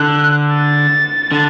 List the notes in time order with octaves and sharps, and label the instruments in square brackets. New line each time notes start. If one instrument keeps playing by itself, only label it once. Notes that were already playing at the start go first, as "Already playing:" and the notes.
Already playing: [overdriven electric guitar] D3 [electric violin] F#6
[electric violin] A6
[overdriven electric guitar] D3